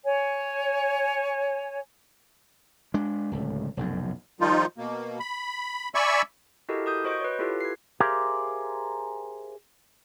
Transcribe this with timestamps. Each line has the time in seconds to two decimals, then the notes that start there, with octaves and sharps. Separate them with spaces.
0.05 C#5 G#5
2.94 G#3 D4
3.32 D1 C#2
3.77 F1 B1 F#2
4.41 D#3 F3 G3 D#4 F4
4.78 B2 A#3
5.20 B5
5.95 D5 E5 G#5 B5 C#6 E6
6.69 E4 F#4 G4 A4 A#4 D#5
6.86 A#4 D#6 G6
7.04 F#4 C5 D#5 C#6 D7
7.20 B4 C#5
7.39 E4 F4 G4 A4 B4
7.60 G#6 C7
8.00 G4 G#4 A#4 C5 E5 F5